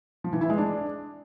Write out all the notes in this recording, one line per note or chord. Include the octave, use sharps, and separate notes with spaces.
F3
E3
E4
G#3
D4